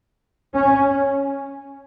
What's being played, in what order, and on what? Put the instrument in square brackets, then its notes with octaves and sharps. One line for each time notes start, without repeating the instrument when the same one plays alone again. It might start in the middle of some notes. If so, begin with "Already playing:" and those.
[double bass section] C#4